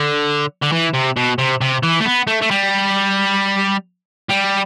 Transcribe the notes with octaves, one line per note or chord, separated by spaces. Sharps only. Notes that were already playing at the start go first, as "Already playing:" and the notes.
Already playing: D3
D3
E3
C3
B2
C3
C3
E3
A3
B3
A3
A3
G3
G3